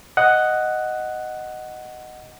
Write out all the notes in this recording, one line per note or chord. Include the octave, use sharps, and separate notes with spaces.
D#5 F#5